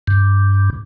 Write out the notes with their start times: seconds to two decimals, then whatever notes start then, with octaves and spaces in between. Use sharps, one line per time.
0.07 G2